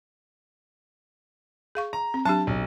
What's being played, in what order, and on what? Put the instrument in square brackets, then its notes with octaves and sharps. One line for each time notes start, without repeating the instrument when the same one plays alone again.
[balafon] G#4 F5 C#6
[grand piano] A#5
[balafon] C4
[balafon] F#3 D4 G4 [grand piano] A5
[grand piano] B1